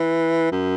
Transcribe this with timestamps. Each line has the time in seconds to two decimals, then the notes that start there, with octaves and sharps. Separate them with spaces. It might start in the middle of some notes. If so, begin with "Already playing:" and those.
Already playing: E3
0.52 F#2